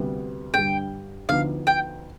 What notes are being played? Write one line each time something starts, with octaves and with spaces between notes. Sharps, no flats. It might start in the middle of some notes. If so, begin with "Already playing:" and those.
Already playing: D2 C3 G3 B3
G2 D3 G3 G5
D2 D3 F3 B3 D#4 F5
G5